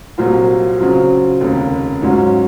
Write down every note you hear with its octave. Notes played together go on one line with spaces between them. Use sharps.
C2 A#2 F#3 C4 F4
C#3 F#3 C4 F4
F1 D#2 C#3
G#2 F#3 C#4 F4